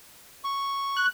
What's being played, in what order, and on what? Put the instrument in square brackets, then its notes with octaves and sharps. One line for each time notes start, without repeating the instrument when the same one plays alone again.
[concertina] C#6
[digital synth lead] F#6